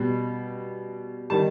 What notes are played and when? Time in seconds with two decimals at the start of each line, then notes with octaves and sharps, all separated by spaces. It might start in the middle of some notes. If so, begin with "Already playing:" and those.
Already playing: B2 G3
1.30 D#3 G3 A5